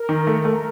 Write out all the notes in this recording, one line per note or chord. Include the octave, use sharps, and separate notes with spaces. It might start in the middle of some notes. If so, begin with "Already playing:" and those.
Already playing: A#4
D#3
A3
A3